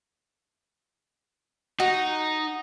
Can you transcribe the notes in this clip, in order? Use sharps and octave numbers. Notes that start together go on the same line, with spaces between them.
D#4 F#4